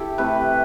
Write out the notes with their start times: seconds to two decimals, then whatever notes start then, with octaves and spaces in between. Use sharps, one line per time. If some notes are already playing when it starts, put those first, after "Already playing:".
Already playing: E4 G4 A4
0.18 C3 E3 A3 B4